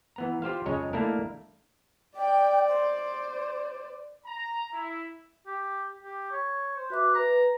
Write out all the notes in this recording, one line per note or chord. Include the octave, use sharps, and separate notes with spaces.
E3 B3 A#5
F4 G4 C5 F5
F2 C#3 G#3 C#5 D#5 A#5
A3 A#3 D4 E4 A4 A#4
D5 G5
C5
A#5
E4
G4
G4
C#5
C5
F#4 B4 E5 D6
B4 A#5